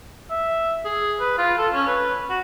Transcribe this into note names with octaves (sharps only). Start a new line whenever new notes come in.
E5
G#4
B4
F4
A4
C#4
B4
F#4